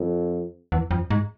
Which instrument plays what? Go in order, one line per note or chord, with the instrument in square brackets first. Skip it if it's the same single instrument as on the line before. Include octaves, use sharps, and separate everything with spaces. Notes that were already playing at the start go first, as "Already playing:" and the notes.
Already playing: [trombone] F2
[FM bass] E2
F2
G#2